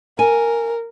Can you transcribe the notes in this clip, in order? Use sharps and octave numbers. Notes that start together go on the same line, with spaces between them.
A#4 G#5